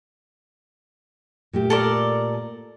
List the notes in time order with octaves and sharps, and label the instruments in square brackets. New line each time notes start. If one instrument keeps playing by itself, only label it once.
[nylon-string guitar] A#2 A3 G4
[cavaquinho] A4 A#4 D5